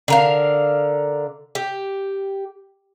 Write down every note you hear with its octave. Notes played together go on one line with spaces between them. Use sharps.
D3 A#4 F5
G4